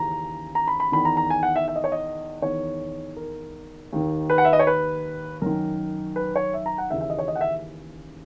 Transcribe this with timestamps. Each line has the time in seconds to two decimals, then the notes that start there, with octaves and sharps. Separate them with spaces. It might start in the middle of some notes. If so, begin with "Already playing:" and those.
Already playing: D#2 C#3 E3 A#5
0.55 A#5
0.68 B5
0.80 B5
0.92 E2 D#3 B5
1.05 A#5
1.17 A#5
1.30 G#5
1.43 F#5
1.56 E5
1.68 E5
1.76 D#5
1.84 C#5
1.92 D#5
2.42 E2 D#3 C#5
3.16 A#4
3.92 D#2 D#3
4.30 B4
4.38 F#5
4.45 E5
4.53 D#5
4.59 C#5
4.67 B4
5.42 F#2 D#3 A#4
6.16 B4
6.36 C#5
6.54 E5
6.66 A#5
6.78 F#5
6.90 D#2 C#3 E3 E5
7.01 E5
7.10 D#5
7.19 C#5
7.28 D#5
7.35 F#5
7.41 E5